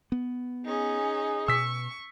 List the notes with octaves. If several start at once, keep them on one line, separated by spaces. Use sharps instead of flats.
B3
C#4 D#4 G#4
B2 C#6 E6 B6